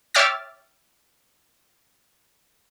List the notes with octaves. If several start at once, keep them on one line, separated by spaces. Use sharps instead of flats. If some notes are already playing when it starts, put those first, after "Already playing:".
C#5 E5 G5 D6 F6 A6